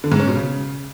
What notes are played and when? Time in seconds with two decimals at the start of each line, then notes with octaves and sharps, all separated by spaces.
0.04 D3
0.12 G#2
0.19 C#4
0.27 B2
0.35 C#3